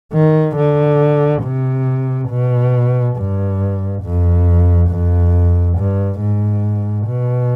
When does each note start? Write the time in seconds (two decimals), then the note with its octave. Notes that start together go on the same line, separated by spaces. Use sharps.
0.13 D#3
0.57 D3
1.43 C3
2.30 B2
3.17 G2
4.03 F2
4.90 F2
5.78 G2
6.21 G#2
7.08 B2